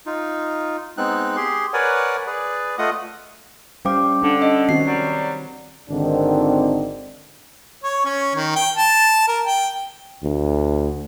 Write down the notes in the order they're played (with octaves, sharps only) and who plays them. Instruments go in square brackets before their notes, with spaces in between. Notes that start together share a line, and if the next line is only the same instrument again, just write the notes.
[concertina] D#4 F4
G#3 B3 C4 D#4 F#6
G4 G#4 C6
A#4 B4 C#5 D5 F#5 G#5
G#4 B4 D5
A3 F4 D#5 F#5 D#6
[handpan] G3 C5 F5 [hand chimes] C#4 G5 D6
[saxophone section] D3 [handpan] D4
[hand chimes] C#4 D#5
[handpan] D#3 C4 F#4 [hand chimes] C7
[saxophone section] F#3 G3 D4
[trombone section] G#1 D3 D#3 C4 D4
[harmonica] C#5
C#4
D#3
G5
A5
A#4
G5
[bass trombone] D2